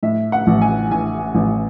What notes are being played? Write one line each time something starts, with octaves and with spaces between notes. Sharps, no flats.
A2 E5
F#5
A1
G#5
A2 G#5
A1